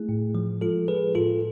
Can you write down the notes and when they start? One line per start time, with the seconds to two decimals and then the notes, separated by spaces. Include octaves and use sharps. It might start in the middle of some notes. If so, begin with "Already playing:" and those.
Already playing: A3 E4 G#4
0.09 A2
0.35 F3
0.61 G#3 F4 A4
0.88 G#3 G#4 B4
1.15 A2 F4 A4